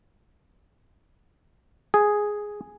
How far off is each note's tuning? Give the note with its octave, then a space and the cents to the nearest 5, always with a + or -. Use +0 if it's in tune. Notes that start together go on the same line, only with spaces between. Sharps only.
G#4 +0